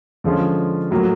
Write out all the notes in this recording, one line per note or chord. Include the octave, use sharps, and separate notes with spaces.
D3 F3 G#3 C#4 F4
A2 F#3 A#3